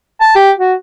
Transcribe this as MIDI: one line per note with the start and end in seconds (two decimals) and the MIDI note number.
0.21 0.35 81
0.35 0.51 67
0.59 0.74 66